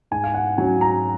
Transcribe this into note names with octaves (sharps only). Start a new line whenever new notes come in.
G#2 G#5
F5
F#5
F#3 C#4 G#5
A#5